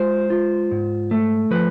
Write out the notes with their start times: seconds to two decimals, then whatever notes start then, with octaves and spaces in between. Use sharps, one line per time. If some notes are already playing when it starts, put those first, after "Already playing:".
Already playing: G#3 F4 C5
0.30 F4
0.71 G#2
1.11 A3
1.51 F3 B4